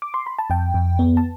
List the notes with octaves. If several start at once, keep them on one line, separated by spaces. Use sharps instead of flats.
D6
C6
B5
A5
F2 G5
F2
B3
A5